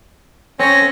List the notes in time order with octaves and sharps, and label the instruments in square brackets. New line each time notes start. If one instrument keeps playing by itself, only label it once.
[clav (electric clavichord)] C4 C#5 [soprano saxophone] C#4 [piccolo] A#6